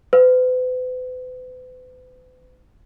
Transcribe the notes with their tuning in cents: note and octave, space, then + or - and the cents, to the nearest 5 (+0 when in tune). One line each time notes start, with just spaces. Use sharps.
B4 +45